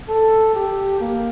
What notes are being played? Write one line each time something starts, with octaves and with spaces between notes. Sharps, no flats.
A4
G4
A#3